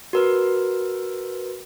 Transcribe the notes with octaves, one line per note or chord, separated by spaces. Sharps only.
F#4 A#4 B4